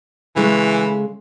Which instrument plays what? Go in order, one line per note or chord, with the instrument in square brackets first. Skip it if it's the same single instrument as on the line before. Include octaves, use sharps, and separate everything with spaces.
[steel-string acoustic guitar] C#3 G#3 A3 [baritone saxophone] E3